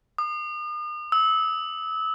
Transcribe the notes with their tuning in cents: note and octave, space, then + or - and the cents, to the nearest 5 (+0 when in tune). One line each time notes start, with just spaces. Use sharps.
D#6 -40
E6 -25